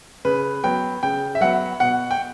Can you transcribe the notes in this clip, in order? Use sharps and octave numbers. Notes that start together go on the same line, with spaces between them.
C#3 B4
F#3 B3 G5
C#3 G5
E5
F#3 B3 F#5
B2 F#5
G5